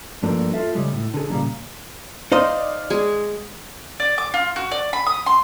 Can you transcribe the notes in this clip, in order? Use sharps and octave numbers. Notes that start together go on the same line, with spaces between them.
G2 F3 A3 A#3 D4
F4 A4 E5
C#3 G3 G#3
A2
D3 G#4
A#2 C#3 G3 G#3 A#3
D#4 C5 D5 D#5 F5
G#3 G#5
D5
D6
F4
F#4
D5
B5
D#6
C6